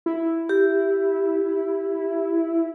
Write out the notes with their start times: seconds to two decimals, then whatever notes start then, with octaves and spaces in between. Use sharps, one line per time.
0.06 E4
0.49 G4